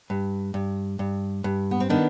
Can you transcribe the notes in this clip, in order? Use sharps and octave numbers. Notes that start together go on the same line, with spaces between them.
G2
G2
G2
G2
B3
C4
D#3 B3 D4